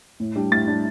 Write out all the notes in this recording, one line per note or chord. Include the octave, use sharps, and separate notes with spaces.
A2
G3 D4
A2 A6
G3 D4